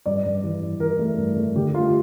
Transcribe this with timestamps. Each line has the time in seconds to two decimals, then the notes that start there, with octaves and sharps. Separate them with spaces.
0.06 G2 D5
0.25 G2
0.44 E3
0.62 G2
0.80 E3 A#4
0.99 A3
1.18 G2
1.36 A3
1.55 D3 G4
1.74 A3 F4